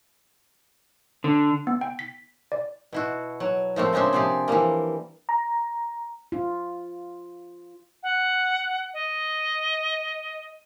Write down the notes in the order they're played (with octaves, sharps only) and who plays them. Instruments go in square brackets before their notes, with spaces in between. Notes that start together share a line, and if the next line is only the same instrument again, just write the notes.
[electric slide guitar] D3
[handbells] B3
G5
B6
D5
[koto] B2 E4 F#4
F#3
F3 A3 A#3 C4
C#3 G#3 C4 D4 E5
C3 F3 G4 G#4 D5
E3 F3 G3 A#3
[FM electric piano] A#5
[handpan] F4
[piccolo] F#5
D#5